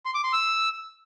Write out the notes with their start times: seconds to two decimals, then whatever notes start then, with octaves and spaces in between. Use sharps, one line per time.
0.05 C6
0.15 D6
0.24 C6
0.33 E6